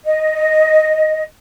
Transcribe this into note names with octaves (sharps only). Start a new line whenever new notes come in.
D#5